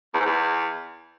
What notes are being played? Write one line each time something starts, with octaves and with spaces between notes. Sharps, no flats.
E2
G#2
E2